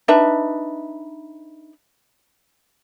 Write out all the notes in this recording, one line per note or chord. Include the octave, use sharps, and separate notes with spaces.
D4 D#4 B4 E5